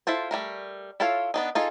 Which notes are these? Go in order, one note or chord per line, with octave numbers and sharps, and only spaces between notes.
E4 F4 A4 C5
G3 A3 A#4
E4 F4 A4 C#5 F5
B3 D4 D#4
D#4 F4 G#4 A4